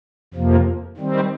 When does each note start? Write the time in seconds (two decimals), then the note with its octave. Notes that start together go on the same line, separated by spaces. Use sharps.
0.34 F2 C3 F3 A#3
0.98 D#3 G3 C4